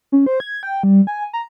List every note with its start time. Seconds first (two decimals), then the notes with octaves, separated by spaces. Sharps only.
0.12 C#4
0.26 C5
0.40 G#6
0.63 G5
0.83 G3
1.07 G#5
1.33 A#5